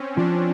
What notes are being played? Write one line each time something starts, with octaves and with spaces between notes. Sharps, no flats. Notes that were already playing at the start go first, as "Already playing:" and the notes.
Already playing: C4 C#4
F3 D4